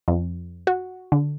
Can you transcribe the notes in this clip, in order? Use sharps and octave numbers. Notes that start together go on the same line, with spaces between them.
F2
F#4
D3